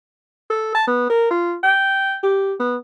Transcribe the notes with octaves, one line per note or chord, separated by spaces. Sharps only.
A4
A5
B3
A#4
F4
G5
G4
B3